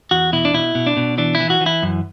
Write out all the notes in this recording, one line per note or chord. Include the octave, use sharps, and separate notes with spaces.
E2 F#4
B2 E4
D4
B2 E4
B2
D4
B2
E3 D4
E4
E3
F#4
E3
E4
F#2